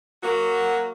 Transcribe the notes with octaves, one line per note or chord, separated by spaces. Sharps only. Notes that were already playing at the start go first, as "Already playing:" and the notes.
F#3 A#3 F#4